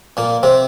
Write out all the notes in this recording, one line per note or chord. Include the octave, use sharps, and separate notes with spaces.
A#2 A#3
C3 C4